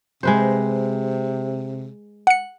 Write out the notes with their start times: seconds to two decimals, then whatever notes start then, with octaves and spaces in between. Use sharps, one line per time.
0.23 C3 G#3 B4 C5
2.27 F#5 C#7